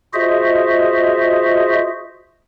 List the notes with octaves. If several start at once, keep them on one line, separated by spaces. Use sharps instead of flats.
F4 F#4 G#4 C5 D#5 E5